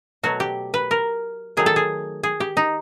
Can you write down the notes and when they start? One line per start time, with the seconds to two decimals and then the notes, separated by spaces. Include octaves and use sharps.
0.23 B2 F#3 A3 F#4
0.40 G4
0.74 B4
0.91 A#4
1.57 D#3 F#3 A3 G#4
1.66 A4
1.76 G#4
2.23 G#4
2.40 G4
2.57 D#4